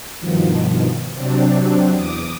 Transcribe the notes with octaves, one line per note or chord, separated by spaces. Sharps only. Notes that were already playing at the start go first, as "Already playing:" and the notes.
G2 B2 D#3 F3
C3 F#3 C4 D4
E2 D6 D#6